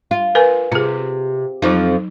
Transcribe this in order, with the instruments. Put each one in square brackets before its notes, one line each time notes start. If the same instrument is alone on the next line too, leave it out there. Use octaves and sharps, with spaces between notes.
[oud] F4
[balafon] A#4 B4 G#5
[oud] C3 [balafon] F4 G#4
[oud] F2 F3 [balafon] F#3 D#4